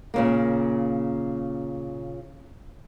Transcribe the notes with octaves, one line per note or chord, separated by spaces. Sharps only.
A#2 C#3 A#3